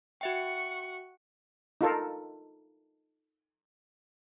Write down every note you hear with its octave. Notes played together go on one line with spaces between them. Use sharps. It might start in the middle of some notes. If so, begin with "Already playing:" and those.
F#4 E5 F#5 G5 C#6
D#4 F4 A4 A#4